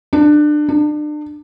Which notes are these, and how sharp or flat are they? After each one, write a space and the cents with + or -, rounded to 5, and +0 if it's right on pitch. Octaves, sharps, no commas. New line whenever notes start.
D4 +25
D4 +35